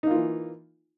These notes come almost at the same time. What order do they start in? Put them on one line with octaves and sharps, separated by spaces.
D#4 A#3 F4 E3